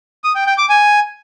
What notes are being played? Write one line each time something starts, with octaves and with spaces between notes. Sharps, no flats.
D#6
G5
G5
D6
G#5